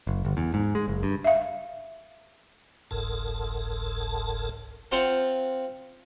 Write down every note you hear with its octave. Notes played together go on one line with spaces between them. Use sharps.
F#1
G1
E2
G#2
G#3
F#1
G2
E5 F5
F#1 C2 G#2 A4 A#4 A5
C4 F4 C5 F5 F#5 A5